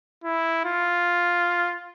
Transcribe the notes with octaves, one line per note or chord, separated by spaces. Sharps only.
E4
F4